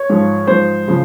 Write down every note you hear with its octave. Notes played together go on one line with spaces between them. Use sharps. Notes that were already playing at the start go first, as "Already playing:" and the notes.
Already playing: C#5
G#2 F3
G#2 F3 C5
C#3 F3